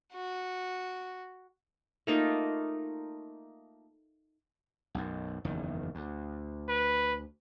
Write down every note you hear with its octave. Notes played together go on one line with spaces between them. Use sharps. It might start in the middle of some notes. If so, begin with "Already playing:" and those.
F#4
A3 A#3 D#4 F4
B1 F#2
F#1 E2 D#3
D2
B4